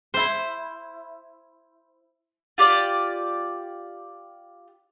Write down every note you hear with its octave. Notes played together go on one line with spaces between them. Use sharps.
E4 C5
F4 G4 D5